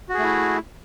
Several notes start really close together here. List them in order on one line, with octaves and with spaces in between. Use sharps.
F#4 G#4 A3 E4